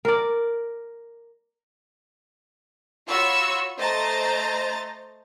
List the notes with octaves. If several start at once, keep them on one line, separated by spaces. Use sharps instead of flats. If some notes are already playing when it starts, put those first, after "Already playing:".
A#4 D5
F4 F#4 C#5 B5 C#6 E6
A3 C5 D#5 A#5 A6